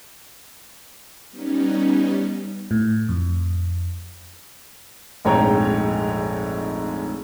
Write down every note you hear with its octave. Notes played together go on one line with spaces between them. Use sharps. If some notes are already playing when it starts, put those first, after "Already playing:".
G3 B3 C#4 D#4
A2
F2
F1 A#1 G#2 C#5 G5 A#5